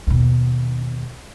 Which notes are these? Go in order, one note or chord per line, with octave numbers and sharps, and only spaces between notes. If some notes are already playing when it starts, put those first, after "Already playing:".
D#2 B2